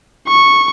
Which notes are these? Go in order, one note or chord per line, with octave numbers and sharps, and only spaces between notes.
C#6